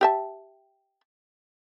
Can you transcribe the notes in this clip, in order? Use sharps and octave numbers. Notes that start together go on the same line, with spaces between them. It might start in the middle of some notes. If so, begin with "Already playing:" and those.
G4 E5 A5